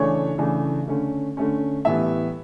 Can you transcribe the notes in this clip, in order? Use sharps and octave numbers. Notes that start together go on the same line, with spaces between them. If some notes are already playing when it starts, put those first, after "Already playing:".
Already playing: C#3 E3 A3 D4 C#5
C#3 E3 A3 D4
D3 A3 C#4
D3 A3 C#4
A2 E3 G3 B3 E5